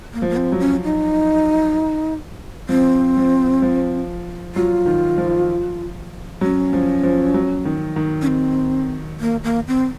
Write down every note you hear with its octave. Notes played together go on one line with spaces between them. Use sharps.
A#3
F3
A#3
C4
F#3
C#4
D#4
F3 C4
F3
F3
F#3 F4
D#3
F3
F#3 C#4
F3
F3
F#3
D#3
D#3
C#4
C4
A#3
A#3
C4